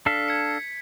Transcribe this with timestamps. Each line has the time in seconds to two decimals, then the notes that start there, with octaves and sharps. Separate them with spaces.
0.06 D4 A4 F5 B6
0.28 G#6 C#7